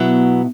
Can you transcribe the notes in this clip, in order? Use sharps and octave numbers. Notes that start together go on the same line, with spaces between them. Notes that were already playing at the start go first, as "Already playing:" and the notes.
Already playing: B2 F#3 B3 E4